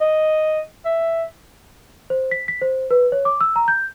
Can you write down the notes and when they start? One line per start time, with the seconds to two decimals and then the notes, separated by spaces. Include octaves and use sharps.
0.01 D#5
0.85 E5
2.10 C5
2.31 B6
2.48 B6
2.62 C5
2.91 B4
3.12 C#5
3.25 D6
3.41 E6
3.56 A#5
3.68 G6